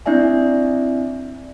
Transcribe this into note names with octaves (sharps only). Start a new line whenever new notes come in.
C4 D4 E4 D5 E5 G#5